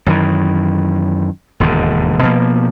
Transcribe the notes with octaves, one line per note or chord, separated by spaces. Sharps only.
F#2 D#3 E3
E1 D#2 G#2 D3
B2 F3 A#3